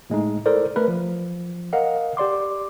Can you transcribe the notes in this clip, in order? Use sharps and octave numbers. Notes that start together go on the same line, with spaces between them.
A2 G#3 A3 D#4
E4 A4 A#4 C5 D5
A3 A#4 B4
F3
A#4 D#5 F5 F#5
G4 D5 C6 D6